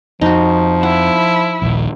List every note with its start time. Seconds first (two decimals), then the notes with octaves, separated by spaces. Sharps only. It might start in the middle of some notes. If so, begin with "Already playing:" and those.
0.21 F2 F3 D#4 F#4
0.83 E4 F#5
1.62 D#1 A#1